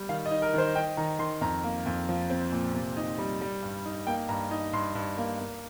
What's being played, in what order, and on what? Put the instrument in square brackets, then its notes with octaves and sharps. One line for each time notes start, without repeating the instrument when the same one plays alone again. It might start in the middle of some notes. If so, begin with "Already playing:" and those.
Already playing: [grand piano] G3
D#3 F5
D#5
D#4
A#4
D#3 C5
D#4 G5
D#3 A#5
D#3 C6
F2 A#5
A#3
F2
F3
C4
A#2
C3
D#4
G3
G3
G2
D#4
A#3 G5
G2 A#5
D#4
G2 C6
G2
A#3
A#3